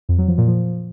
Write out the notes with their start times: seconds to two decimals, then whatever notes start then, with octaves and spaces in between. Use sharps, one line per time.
0.09 F2
0.18 F#3
0.28 F3
0.38 A#2
0.48 F3